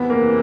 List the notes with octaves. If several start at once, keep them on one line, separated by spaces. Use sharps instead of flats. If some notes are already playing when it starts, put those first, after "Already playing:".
Already playing: E2 C3 E3 B3
A#3